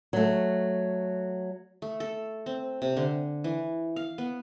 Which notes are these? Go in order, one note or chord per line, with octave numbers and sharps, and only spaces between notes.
F#3 A3
A3
A4
C4
C3
D3
E3
F5
B3